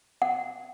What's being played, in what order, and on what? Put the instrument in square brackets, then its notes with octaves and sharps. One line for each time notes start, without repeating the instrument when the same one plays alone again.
[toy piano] F#5